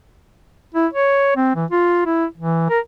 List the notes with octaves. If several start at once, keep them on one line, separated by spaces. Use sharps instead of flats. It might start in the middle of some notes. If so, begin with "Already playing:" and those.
E4
C#5
C4
E3
F4
E4
E3
A#4